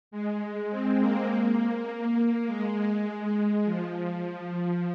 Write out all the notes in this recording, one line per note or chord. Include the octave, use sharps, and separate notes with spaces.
G#3
C4
A#3
G#3
F3